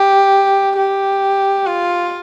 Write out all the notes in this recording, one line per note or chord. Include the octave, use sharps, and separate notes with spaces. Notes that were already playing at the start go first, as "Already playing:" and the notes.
Already playing: G4
G4
F4